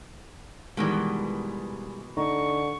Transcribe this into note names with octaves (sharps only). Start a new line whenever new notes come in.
B2 D#3 E3 G3 G#3
D3 D#4 C#6